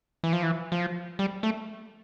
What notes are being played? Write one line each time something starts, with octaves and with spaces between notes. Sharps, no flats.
E3
F3
E3
F3
G3
A3